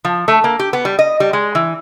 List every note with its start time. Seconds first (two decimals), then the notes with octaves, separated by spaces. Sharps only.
0.05 F3
0.28 A3
0.44 A#3
0.59 G4
0.73 B3
0.85 G3
0.99 D#5
1.20 G3
1.33 G#3
1.55 E3